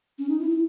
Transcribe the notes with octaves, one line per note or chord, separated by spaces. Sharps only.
C#4
D#4
E4
E4